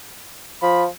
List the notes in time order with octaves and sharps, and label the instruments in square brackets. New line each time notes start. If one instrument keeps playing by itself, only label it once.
[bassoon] F3 [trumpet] B5